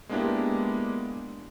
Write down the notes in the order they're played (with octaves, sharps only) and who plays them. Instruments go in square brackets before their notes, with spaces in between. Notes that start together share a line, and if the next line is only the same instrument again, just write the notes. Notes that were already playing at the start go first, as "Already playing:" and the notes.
[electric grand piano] G#3 A#3 B3 D4 E4 G4